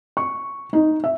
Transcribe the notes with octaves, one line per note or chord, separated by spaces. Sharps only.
C#6
D#4
E5